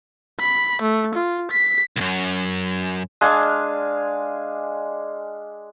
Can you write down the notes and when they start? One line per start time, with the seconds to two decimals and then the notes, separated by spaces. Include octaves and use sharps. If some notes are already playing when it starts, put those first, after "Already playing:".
0.40 B5
0.82 A3
1.15 F4
1.51 B6
1.96 C2 F#2
3.21 G#3 D4 F5 G#5